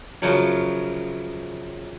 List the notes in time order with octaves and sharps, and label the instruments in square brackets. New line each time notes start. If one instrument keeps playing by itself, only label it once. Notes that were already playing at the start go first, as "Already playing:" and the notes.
[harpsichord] F#2 C#3 F3 F#3